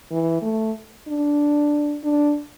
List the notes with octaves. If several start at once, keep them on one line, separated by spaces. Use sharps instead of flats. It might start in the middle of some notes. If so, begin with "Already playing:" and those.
E3
A3
D4
D4